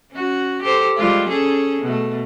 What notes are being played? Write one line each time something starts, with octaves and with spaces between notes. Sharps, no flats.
C#4 F#4
G4 A4 C5
G3 G#3 F4
C#4 G#4 A4
B2 A3